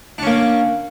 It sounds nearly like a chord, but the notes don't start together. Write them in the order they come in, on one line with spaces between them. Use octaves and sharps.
D4 C#4 A#3